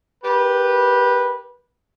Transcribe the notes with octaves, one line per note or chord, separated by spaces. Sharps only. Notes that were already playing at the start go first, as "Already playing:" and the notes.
G4 A#4 B4